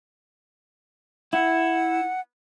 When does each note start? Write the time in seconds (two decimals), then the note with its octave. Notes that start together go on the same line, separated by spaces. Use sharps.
1.33 E4 F#5